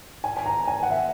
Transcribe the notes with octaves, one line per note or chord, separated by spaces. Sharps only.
G#5
G#5
A#5
G#5
F#5
E5